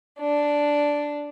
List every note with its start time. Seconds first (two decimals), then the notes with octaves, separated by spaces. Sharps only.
0.20 D4